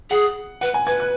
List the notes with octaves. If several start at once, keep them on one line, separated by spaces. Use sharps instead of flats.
G#4 F#5
B4 F#5
G#5
B4 G#6
F#6